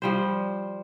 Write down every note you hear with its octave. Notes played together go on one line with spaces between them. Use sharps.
F3 G3 C5